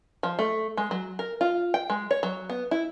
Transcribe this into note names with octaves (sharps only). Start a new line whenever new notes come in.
F3
A3
G#3
F#3
A#4
F4
G5
G#3
C#5
F#3
B3
E4